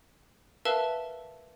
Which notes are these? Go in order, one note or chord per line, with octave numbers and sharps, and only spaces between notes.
A#4 B4 E5 F5 A5 E6